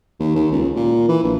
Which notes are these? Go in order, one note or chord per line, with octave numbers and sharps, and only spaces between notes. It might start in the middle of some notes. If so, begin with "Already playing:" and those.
D#2
D#2
C#2
A#2
E3
A#1